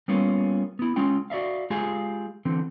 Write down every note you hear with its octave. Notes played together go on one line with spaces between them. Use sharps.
G3 A#3 B3 C#4 F4
B3 E4
G#3 C#4 F4 G5
F#4 D5 E5 F5
G#3 F4 G4 G#4 F5 G#5
D3 E3 C4